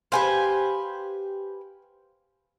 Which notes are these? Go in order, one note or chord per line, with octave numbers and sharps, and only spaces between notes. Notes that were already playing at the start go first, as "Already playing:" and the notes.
G4 B4 C5 F5 G#5